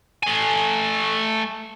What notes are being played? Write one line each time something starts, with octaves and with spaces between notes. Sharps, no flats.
A3 G#5